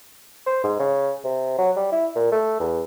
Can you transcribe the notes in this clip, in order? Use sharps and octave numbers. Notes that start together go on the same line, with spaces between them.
C5
G#2
C#3
C3
F#3
G3
E4
A#2
A3
E2